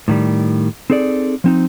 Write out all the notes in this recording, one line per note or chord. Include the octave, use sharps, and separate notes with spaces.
A2 D#3 G3
C4 D#4 G#4 A4 D5
F3 C4 D#4